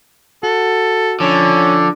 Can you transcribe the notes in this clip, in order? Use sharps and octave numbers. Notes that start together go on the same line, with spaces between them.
F#4 A4
D3 F3 C#4